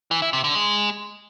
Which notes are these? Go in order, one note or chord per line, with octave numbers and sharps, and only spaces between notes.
E3
E4
C3
D3
G#3